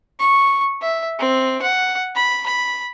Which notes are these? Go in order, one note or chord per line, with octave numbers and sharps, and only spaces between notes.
C#6
E5
C4
F#5
B5
B5